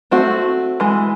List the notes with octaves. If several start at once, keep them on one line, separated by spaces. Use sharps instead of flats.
A3 C4 F#4
E3 G#3